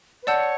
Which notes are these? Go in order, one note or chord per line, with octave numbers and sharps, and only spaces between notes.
B4
C#5 D5 F#5 A5 E6 G6